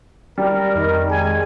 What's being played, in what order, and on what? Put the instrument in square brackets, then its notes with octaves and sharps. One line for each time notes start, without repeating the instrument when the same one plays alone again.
[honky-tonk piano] G3 [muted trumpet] A#4
[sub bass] F2 [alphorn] D#3
[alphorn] G#3 [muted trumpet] G#5